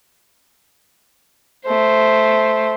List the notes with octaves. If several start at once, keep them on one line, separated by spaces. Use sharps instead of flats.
A3 C5